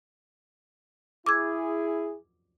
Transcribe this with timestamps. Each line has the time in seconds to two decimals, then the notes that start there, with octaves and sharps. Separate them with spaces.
1.26 E4 G#4 D6 E6 G#6